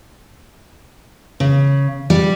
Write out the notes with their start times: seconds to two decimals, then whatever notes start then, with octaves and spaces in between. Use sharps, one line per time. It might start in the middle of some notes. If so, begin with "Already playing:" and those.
1.40 C#3
2.10 G3